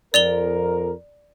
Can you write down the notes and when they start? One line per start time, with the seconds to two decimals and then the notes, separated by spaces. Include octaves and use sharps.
0.14 F2 A#4 D5 F7 G7